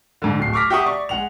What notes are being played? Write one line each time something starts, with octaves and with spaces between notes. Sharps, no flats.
G#2 D3
D1 C7
C#6 D6 F6 A#6 B6
G4 E5 F#5 C#6 D#6
D5 C#6
G#3 F#5 F7